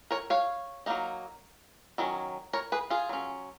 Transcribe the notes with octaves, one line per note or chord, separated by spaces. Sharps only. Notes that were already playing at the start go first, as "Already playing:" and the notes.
A#4 C#5
C#5 F5
F#3 A#3 D#4
D#3 F#3 C#4
A#4 C#5
G#4 B4
F4 G#4
F#3 C#4